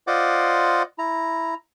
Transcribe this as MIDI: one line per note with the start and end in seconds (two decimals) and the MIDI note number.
0.07 0.83 65
0.07 0.83 72
0.07 0.83 74
0.07 0.83 75
0.07 0.83 78
0.07 0.83 86
0.99 1.54 64
0.99 1.54 82